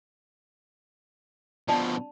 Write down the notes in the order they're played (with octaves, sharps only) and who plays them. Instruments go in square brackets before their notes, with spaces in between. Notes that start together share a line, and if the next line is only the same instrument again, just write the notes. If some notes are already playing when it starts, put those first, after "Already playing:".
[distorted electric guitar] B2 F3 [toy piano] D4 D5 A5